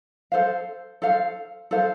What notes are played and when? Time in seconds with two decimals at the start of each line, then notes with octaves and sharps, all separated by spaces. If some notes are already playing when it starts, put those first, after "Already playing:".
0.32 A4 C5 F5
1.02 A4 C5 F5
1.71 A4 C5 F5